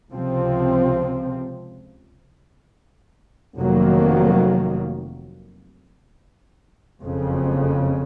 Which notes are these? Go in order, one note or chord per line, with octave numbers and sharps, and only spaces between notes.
C#2 C3 F3 C4
F1 F2 D#3 F#3 A#3
F#1 F2 C#3